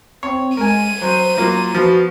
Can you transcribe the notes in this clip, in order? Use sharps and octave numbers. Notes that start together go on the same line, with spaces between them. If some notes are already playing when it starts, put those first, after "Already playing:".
C4 C#5
G#3 A#4 G#5 D#7
F#3 C5
F#3 A#3 F4
F3 B3 F#4